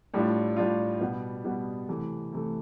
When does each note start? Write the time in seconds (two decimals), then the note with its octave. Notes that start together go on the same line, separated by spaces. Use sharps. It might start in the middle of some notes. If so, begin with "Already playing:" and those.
0.14 A2 G3 D4 F4
0.56 A2 G3 D4 F4
1.00 B2 G3 B3
1.44 B2 G3 B3
1.88 C3 E3 A3
2.32 C3 E3 A3